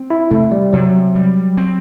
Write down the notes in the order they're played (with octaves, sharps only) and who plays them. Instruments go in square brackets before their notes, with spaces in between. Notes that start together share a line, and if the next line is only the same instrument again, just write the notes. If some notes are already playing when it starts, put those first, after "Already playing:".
Already playing: [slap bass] C4
[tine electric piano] E4
[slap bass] C3 [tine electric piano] A3
[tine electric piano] G3
[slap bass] C3 [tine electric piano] F#3
[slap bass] G3
C4